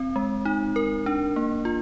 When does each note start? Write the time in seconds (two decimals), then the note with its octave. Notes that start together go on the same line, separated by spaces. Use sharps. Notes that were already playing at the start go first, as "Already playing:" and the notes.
Already playing: C4
0.16 G#3
0.45 D#4
0.76 A#4
1.06 D4
1.36 A#3
1.65 F4